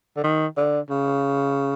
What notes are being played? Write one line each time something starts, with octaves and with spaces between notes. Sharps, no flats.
D3
D#3
D3
C#3